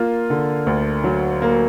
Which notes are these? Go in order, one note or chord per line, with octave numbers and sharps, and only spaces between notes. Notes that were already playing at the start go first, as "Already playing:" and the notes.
Already playing: A#3 F4
D3
D2
F#3
A#3